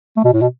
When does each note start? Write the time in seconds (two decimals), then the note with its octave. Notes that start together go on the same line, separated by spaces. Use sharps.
0.16 A3
0.24 B2
0.33 A2
0.42 B2